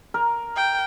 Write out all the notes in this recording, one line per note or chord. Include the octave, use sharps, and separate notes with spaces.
A#4
G5